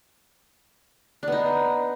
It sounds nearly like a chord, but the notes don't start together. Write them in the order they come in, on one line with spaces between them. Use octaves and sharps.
D4 B3 D#4